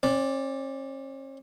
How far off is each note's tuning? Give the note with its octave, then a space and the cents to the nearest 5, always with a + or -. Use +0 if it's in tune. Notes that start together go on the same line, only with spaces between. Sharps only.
C#4 -45 D5 +0